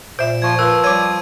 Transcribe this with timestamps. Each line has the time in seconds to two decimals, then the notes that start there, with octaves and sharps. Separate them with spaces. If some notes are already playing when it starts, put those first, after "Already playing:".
0.19 A#2 C5 E5 D7 E7
0.42 F3 C#6 G#6
0.59 F3 A#4 B4 E6
0.84 G3 C#5 D6 G#6 D#7